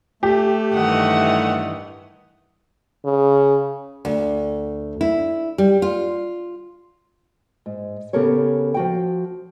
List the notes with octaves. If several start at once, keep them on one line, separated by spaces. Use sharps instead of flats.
A3 G4
G2 D#3 E3 F#5
C#3
D2
E4
G3
F4
G#2
C#3 B3 G4 A4 A#4 C#5
F3 F#4 G5